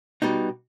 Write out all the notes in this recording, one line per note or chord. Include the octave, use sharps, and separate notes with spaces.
B2 G3 B3 D#4